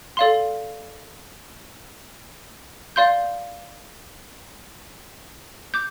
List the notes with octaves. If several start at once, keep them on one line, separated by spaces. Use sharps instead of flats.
A4 D5 F5 C6
D5 F5 C6 G6
D6 G6